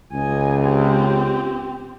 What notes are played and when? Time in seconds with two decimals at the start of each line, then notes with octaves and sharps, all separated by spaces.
0.13 C#2 D#5 G#5
0.61 C4 G4